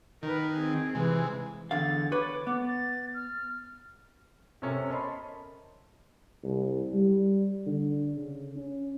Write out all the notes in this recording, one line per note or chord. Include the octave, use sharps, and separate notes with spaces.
D#3 A#4 B4
C4 G#4
C3 E3 G#3
E2 D3 F5 A6
B4 C#5 D6
B3
A6
F6
C3 C4 C#4 A4 A#4
A#4 C#5 D#5 A5 B5 C6
C2
G3
D3
C#3
C#4